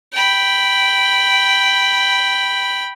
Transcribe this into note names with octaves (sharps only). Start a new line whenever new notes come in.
G5 B5